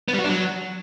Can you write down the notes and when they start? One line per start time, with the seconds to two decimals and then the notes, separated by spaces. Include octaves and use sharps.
0.08 B3
0.13 G3
0.19 F#4
0.24 D4
0.29 F#3